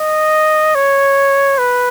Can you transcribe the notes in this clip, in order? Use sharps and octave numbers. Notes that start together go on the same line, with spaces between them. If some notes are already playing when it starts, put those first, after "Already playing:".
Already playing: D#5
C#5
B4